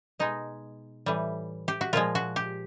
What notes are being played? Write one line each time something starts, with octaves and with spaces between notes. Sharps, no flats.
B2 G#3 D#4
A2 E3 G3
G4
F#4
A#2 F3 G#3 F4
F#4
G4